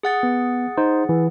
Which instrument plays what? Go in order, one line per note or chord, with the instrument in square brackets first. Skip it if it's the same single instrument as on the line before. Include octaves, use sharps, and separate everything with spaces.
[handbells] G#4 F#5 A6
[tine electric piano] B3
D#4 C5
E3